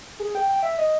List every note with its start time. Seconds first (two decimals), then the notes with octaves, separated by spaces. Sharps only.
0.20 G#4
0.35 G5
0.49 G5
0.63 E5
0.78 D#5